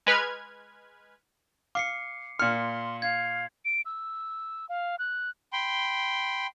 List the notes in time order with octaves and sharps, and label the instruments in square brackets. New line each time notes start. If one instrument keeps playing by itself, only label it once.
[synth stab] G#3 B4 F6 G#6
[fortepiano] F5 [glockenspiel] D6 C7 C#7
[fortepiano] A#2 F6 [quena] C6 [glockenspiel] C#7
[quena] F5 [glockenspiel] G#6
[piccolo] D7
E6
F5
F#6
[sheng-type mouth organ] G5 B5 C6